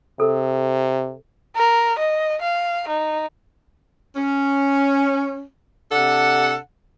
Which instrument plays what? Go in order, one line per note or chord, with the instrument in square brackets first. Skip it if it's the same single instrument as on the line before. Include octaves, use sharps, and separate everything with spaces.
[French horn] C3 [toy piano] A4 A#4
[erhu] A#4
D#5
F5
D#4
[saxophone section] C#4
C3 D4 A4 F#5